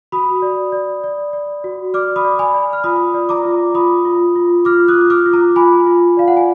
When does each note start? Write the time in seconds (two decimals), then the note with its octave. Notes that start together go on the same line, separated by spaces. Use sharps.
0.12 F#4 B5 D#6
0.42 D5
0.72 D5
1.04 D5
1.33 D5
1.64 F#4
1.94 D5 D6 F6
2.16 B5 D#6
2.24 D5
2.39 G#5 B5
2.54 D5
2.73 F6
2.84 F4 B5 D#6
3.14 D5
3.29 A#5 D6
3.45 F4
3.74 F4 B5 D#6
4.05 F4
4.36 F4
4.65 F4 D6 F6
4.88 D#6 F#6
4.95 F4
5.10 D6 F6
5.26 F4
5.33 A#5 D6
5.56 F4 G#5 B5
5.87 F4
6.17 D5 F5
6.28 F#5
6.37 G#5